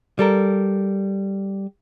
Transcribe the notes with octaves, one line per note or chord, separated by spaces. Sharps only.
G3 A4 A#4